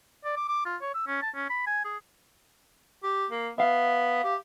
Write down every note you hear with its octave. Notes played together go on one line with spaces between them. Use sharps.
D5
D6
D6
F4
C#5
E6
C#4
A5
C#4
B5
G#5
G#4
G4
A#3
B3 E5 F5
G4